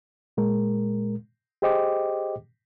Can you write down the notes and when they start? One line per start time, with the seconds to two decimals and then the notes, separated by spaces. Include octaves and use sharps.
0.37 A#2 G#3 A#4
1.62 G4 G#4 C5 D#5 G5 D6